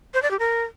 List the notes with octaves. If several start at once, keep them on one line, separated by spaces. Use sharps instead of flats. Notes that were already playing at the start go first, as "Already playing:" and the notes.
C5
D5
G4
A#4